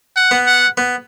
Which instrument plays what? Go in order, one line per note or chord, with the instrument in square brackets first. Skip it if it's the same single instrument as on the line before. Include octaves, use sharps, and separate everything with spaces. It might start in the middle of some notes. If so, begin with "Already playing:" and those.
[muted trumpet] F#5
[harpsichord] B3
[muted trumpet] F#5
[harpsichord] B3